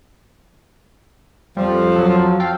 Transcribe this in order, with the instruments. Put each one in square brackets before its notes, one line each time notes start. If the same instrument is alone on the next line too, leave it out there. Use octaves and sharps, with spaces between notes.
[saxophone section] F2 F3 [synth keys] G3
[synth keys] F#3 A4
A4 F5 G5